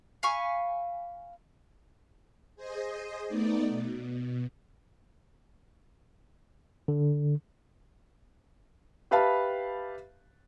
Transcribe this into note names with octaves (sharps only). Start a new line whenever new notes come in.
F5 G#5 B5 C#6
G#4 C5 D#5
A3 B3 D#4 D5
B2
D3
G4 B4 E5 F5 A5 B5